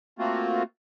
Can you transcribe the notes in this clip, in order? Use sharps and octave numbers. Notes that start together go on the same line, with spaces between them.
A3 A#3 C4 F4 F#4